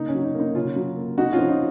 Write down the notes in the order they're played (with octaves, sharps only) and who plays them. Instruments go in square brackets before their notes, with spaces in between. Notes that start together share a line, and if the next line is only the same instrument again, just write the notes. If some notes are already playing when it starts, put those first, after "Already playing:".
Already playing: [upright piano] C#3 A#3 D#4
C#4
F#3
D#4
A#3
D#4
C#3 C#4 F4
F#3
A#3
C3 D#4 F#4
C#4 F4
F3
D#4